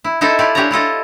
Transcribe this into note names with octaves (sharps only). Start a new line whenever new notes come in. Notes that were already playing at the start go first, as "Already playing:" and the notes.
E4
D#4 E4 A4 C5 D#5 E5
E4 F4 G4 D5
D4 G4 G#4 C5 C#5 A#5
E4 F4 A4 D#5